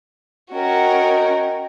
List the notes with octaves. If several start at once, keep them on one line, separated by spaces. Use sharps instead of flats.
C#4 F#4 A#4 D#5 G5